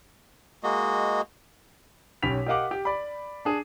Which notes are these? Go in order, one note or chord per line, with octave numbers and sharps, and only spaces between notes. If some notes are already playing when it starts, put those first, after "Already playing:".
G#3 A#3 F#4 D#5
B1 C#4 G4 B5 B6 F7
G4 A#4 D#5 F5 F#5 D6
G4
D5 B5
D4 G#4